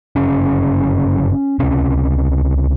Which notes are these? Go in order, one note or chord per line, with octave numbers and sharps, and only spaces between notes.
G1 F#2 C#3 C#4
C#2 C3 C#4